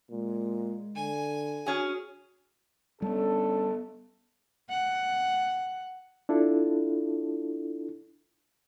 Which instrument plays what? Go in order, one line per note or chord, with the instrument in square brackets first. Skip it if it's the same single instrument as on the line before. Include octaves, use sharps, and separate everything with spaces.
[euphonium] A#2 [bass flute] G#3
[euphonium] D3 [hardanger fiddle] G#5
[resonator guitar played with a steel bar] C#4 G#4 [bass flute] F#4
[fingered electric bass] G3 A#3 B3 [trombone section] C#4 D4 A4
[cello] F#5
[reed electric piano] D4 E4 F4 A4